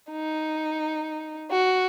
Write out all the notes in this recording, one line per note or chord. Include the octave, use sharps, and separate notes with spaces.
D#4
F#4